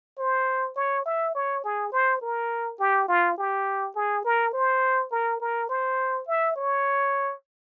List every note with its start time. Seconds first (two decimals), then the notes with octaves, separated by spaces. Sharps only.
0.19 C5
0.76 C#5
1.06 E5
1.35 C#5
1.64 G#4
1.92 C5
2.22 A#4
2.79 G4
3.08 F4
3.38 G4
3.96 G#4
4.25 A#4
4.53 C5
5.12 A#4
5.40 A#4
5.69 C5
6.28 E5
6.56 C#5